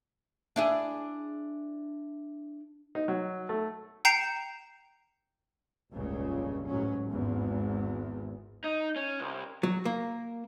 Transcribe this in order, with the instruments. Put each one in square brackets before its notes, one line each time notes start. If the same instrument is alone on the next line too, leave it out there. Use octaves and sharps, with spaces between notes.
[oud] D4 E4 G#4
[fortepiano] D#4
F#3
A3
[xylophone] G5 A#5 G6 C7 C#7 E7
[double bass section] F1 C#2 G2 A#2 C#3
A1 G#2 F#3 C#4
G#1 E2
[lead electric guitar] D#4
C#4
C2
[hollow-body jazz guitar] F#3
A#3